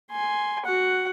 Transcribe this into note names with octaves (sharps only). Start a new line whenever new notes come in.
G#5 C6
F#4 F#5